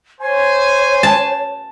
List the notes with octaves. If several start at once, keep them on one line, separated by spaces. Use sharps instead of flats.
C5 C#5 G#5
A5